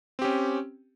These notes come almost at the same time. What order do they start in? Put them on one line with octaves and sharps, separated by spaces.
C4 G4 C#4